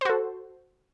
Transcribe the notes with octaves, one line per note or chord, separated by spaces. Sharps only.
F#4 A4 C5